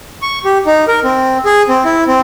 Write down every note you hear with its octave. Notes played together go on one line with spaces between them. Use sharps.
C#6
G4
D#4
A#4
C4
G#4
C4
E4
C4